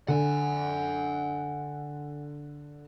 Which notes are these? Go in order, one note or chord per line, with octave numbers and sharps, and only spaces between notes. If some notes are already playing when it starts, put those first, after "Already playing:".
D3 F#5 G#5